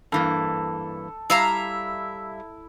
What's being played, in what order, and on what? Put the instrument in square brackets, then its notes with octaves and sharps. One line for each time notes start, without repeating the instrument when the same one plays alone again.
[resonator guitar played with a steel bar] G2 E3 A#3 [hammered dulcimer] A4
[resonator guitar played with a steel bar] G3 [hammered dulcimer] E4 [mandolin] E5 F5 A#5